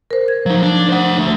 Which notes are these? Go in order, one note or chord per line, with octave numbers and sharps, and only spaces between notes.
A#4 C5
G#6
F3 F#3 D#4
D4
C5 F#5
D3 A3